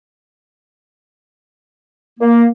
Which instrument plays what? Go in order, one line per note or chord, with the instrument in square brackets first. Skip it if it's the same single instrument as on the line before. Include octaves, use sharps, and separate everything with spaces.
[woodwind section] A#3